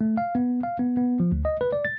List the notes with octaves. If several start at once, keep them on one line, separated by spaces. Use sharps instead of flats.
A3
F5
B3
F5
B3
B3
F3
D2
D#5
B4
D5
A6